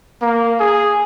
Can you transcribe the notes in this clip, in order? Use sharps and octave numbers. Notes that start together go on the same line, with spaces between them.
A#3
G#4